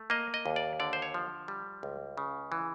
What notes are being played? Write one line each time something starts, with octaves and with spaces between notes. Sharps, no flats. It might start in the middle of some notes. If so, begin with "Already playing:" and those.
Already playing: A3
A#3 D#5
D#5
D#2
D5
D3 D5
C5
C#5
F3
G3
C#2
C#3
E3